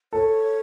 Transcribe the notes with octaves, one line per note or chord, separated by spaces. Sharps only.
A4 C#5